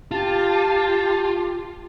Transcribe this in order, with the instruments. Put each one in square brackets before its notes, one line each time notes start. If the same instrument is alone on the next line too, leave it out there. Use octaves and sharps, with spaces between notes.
[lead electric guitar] F4 [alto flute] G4 [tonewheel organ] A5